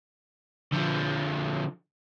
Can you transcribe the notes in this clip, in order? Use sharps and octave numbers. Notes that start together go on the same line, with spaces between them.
D3 F3